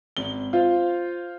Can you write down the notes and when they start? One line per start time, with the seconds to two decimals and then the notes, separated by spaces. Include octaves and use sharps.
0.17 G#1 G7
0.53 F4 C5 F5